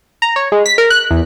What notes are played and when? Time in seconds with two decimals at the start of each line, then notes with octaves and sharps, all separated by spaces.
0.22 A#5
0.36 C#5
0.52 G#3
0.66 B6
0.78 A#4
0.90 F#6
1.11 E2